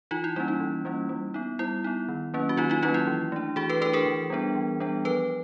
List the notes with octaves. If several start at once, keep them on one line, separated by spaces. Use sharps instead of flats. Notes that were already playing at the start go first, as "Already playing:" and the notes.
E3 D#4 F4
E4
G3 A#3 C#4 D#4
D#4
E3
G3 A#3 C#4
G3
B3 D#4
G3 E4
B3 D#4
D#3
F#3 A#3 C#4
F#4
D#3 D#4 F4
D#4 F4
F#3 A#3 C#4 D#4 F4
E4
E3
A3 D4
E3 F#4 G#4
A4 B4
A3 D4 A4 B4
G#4 A#4
E3
G3 B3 D4
E3
G3 B3 D4
F3 A4 B4